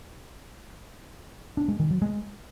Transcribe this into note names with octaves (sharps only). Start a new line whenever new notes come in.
D4
G#3
D#3
F#3
G#3